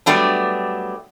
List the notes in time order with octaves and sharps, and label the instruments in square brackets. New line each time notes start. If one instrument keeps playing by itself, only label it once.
[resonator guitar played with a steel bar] F#3 G3 A3 B3 D4